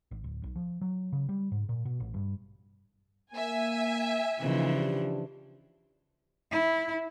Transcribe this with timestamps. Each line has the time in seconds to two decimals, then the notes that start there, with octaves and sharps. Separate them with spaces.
0.11 G#1
0.24 D1
0.44 B1
0.55 F3
0.81 F#3
1.12 C#3
1.29 G3
1.52 G#2
1.69 A#2
1.85 B2
2.00 A1
2.14 G2
3.33 A#3 E5 G#5
4.41 C#3 E3 F3 A3 A#3 D#4
4.74 D4 G4
6.51 E4